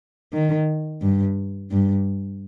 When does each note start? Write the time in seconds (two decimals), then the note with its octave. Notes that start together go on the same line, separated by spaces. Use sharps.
0.34 D#3
1.02 G2
1.71 G2